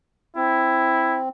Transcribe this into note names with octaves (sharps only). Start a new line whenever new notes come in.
C4 E4